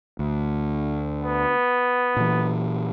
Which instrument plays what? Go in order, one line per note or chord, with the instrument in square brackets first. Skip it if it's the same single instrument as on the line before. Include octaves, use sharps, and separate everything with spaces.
[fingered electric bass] D2
[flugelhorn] B3
[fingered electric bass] A#2 E3